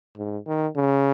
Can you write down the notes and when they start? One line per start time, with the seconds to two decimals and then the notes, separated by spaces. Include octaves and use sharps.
0.18 G#2
0.47 D#3
0.76 C#3